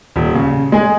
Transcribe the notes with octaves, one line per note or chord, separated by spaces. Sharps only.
D#1
C#3
G#3 G#4